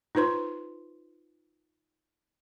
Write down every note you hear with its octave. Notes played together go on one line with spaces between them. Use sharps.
D#4 F4 B4 C5 C6